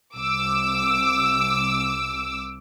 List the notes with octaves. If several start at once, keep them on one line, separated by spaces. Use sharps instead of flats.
C2 D6 E6